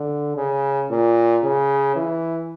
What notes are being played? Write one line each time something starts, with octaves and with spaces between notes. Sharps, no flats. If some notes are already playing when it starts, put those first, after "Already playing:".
Already playing: D3
C#3
A#2
C#3
E3